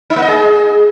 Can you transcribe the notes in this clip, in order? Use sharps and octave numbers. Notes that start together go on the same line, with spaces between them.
D#4
A#3
D#5
G#4